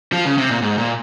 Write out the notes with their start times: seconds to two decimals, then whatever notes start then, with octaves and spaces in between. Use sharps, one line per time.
0.13 F3
0.26 C#3
0.38 C3
0.50 A#2
0.62 G#2
0.78 A#2